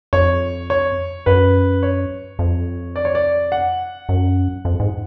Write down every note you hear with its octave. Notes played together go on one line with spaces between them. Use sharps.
F2 C#5
C#5
F#2 B4
C#5
F2
D5
C#5
D5
F#5
F#2
F2
G#2